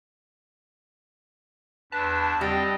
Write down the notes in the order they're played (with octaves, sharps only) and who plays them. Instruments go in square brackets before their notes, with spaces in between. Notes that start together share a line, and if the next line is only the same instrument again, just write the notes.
[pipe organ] E2 D4 [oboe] B4 [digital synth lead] A5
[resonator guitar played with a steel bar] G3 [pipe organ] C4 G5 [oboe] D#5